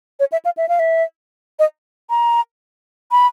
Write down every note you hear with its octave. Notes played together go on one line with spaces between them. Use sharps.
C#5
E5
F5
E5
F5
E5
D#5
A#5
B5